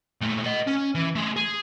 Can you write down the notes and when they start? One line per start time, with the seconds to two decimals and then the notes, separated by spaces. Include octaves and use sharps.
0.21 A#2 A3
0.44 B4 D#5
0.67 C#4
0.95 E3
1.15 A3 G#4
1.36 G#4